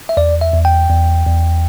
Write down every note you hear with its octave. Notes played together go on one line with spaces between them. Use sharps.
E5
E2 D5
E5
E2
G5
E2
E2